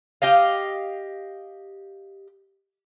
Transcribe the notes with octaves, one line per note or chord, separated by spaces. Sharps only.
G4 D#5 F5